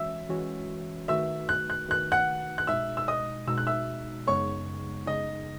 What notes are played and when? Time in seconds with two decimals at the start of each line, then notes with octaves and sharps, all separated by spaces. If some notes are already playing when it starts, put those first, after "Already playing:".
Already playing: E3 G#3 C#4 F#4 C#5 E5 E6
0.29 E3 G#3 C#4 F#4 C#5
1.08 D#3 A3 D#4 F#4 B4 E5 E6
1.49 F#6
1.70 F#6
1.88 D#3 A3 D#4 F#4 B4 F#6
2.12 F#5 F#6
2.58 F#6
2.67 B2 G#3 D#4 E5 E6
2.97 E6
3.08 D#5 D#6
3.47 B2 G#3 D#4 E6
3.58 F#6
3.67 E5 E6
4.27 F#2 C#3 G#3 B3 D#4 C#5 C#6
5.06 F#2 C#3 G#3 B3 D#4 D#5